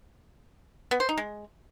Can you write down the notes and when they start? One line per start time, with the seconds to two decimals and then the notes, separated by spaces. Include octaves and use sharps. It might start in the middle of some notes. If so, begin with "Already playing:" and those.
0.91 B3
1.00 C5
1.09 D#4
1.18 G#3